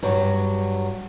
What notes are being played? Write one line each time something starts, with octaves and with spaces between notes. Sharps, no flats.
G2 F#3